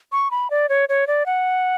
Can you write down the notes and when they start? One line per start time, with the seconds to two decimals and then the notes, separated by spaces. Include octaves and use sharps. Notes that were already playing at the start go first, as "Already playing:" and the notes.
0.12 C#6
0.31 B5
0.50 D5
0.69 C#5
0.89 C#5
1.07 D5
1.26 F#5